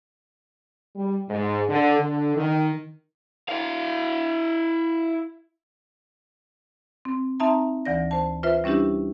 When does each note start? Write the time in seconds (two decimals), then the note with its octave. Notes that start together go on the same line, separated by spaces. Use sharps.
0.96 G3
1.29 G#2
1.69 D3
1.99 D3
2.36 D#3
3.48 E4 F5
7.05 C4
7.40 C4 D#4 E5 A5 A#5
7.85 D2 E3 D5 A#6
8.11 C5 A5
8.43 F4 B4 C5 E5
8.64 G3 C#4 D4 E4 G4